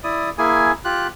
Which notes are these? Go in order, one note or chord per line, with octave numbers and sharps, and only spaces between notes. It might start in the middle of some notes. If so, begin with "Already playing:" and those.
E4 D5 D#6
A#3 E4 G#4 G#5
F4 G4 F#6